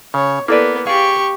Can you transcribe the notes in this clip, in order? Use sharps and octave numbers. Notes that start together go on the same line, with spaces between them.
C#3 C#5
A#3 B3 E4 A4 B4 D5
G4 G#4 D5 F5 C#6